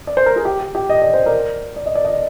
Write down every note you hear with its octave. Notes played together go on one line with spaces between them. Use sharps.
D5
C5
A#4
G#4
G4
G4
G4
D#5
D5
C5
A#4 D5
D5
D#5
D5
D#5